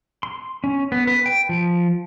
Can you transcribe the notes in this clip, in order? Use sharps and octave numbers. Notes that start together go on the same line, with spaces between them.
C6
C#4
B3
B4
G5
F3